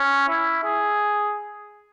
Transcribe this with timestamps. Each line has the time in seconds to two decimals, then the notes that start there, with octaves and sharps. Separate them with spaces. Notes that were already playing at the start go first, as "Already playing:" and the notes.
Already playing: C#4
0.28 E4
0.64 G#4